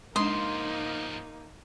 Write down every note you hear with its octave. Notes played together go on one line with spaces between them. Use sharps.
G#2 F3 G#3 A#3 D4 D#4 C6